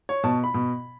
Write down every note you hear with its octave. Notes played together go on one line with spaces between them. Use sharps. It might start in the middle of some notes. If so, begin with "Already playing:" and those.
C#5
B2 A5
B5
B2